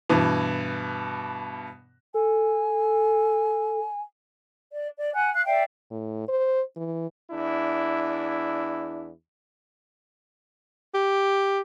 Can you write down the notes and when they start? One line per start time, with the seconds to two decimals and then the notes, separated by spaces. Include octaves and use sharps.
0.09 G2 B2 E3
2.14 A4 G#5
4.72 D5
4.97 D5
5.14 F#5 G#5 F#6
5.34 F5 F#6
5.46 D5 E5 F5 G5
5.91 A2
6.28 C5
6.76 E3
7.31 E2 D4 E4
10.94 G4